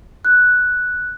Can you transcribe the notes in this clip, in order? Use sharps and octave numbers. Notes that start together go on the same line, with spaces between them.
F#6